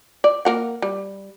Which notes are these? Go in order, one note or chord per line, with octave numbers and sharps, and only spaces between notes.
D5
A#3 A#4 F#5
G3